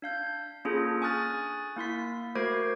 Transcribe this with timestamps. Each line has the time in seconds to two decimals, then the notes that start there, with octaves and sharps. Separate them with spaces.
0.02 D4 F5 G6
0.65 A#3 C#4 D4 F4 G#4 A4
1.02 G#5 C#6 D#6 F6 F#6 A6
1.76 A#3 E4 C6 B6
2.35 A3 F#4 A#4 C5 G#6